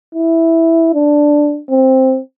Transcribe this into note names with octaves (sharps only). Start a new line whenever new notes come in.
E4
D4
C4